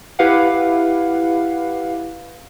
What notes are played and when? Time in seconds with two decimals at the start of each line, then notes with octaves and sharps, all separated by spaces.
0.19 E4 G4 B4 F5 F#5